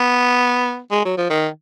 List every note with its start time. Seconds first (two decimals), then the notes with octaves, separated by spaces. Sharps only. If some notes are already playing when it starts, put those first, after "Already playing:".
Already playing: B3
0.91 G#3
1.05 F#3
1.17 F3
1.30 D#3